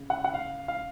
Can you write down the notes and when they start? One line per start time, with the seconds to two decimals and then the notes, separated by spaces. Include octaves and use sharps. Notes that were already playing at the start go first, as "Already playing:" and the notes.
Already playing: C#3
0.10 F#5
0.24 F#5
0.34 F5
0.68 F5